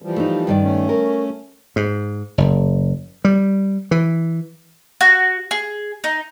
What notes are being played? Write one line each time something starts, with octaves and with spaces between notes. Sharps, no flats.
E3 F3 G3
A3 D#4
G2 D#3 D5
A3 C#4
A#4
G#2
F#1
G3
E3
F#4
G#4
D#4